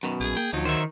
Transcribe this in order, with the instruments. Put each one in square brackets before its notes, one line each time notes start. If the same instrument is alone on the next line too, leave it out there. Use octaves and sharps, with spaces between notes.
[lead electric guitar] F#2 B2 [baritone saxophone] D#3
[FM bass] A#1 [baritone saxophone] G#4
[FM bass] A#3 [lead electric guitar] G5
[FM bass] D2 [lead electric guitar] F3 D#4 [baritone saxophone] F#3
[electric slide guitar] D#3 [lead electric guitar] C5 E5